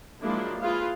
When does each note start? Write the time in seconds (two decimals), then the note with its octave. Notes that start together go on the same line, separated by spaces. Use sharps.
0.22 F3 F#3 G#3 A#3 D4 E4
0.61 E4 F4 G#4 B4 F5